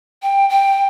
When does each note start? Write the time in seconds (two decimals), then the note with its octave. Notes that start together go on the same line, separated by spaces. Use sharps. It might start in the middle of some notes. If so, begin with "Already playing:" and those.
0.22 G5
0.50 G5